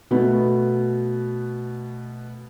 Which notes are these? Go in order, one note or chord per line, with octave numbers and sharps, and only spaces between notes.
B2 A3 B3